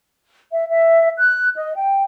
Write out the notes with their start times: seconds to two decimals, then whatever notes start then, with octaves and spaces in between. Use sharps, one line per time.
0.53 E5
0.70 E5
1.18 F#6
1.56 D#5
1.75 G5